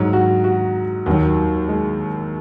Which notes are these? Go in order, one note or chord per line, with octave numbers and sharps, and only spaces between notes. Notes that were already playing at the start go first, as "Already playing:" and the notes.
Already playing: G#2 F#3
F#4
F#4
D#2 D#3 F#3
G#3